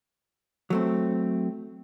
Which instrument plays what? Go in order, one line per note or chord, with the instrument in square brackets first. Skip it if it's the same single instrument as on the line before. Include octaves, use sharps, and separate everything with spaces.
[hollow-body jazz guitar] F#3 A3 C4